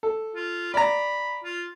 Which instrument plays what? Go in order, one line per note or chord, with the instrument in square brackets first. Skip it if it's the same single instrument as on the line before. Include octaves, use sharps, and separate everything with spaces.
[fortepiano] A4
[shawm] F4
[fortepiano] D5 A#5 [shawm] B5
[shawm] F4